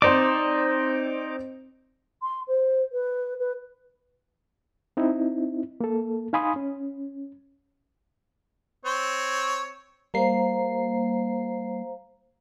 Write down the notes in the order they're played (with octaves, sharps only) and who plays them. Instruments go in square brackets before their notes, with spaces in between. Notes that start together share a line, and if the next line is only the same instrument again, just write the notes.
[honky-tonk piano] C4 C5 D5 [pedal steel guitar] D#4 D6
[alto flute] C6
C5
B4
B4
[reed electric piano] C4 D#4 E4
A#3 A4
D#4 F5 G#5 B5 C6 D#6
C#4
[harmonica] C4 C#5
[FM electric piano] G3 A#3 C7 [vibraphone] C5 F5 A#5